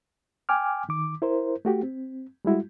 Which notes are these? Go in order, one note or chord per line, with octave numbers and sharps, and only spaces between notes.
G5 G#5 D6 F6
D#3 D6
E4 A#4 C5
A3 F#4 G4
C4
G3 G#3 E4 F#4